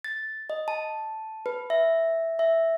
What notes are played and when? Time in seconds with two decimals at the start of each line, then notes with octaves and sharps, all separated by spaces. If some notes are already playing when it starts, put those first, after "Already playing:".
0.04 A6
0.50 D#5
0.68 A5
1.46 B4
1.70 E5
2.39 E5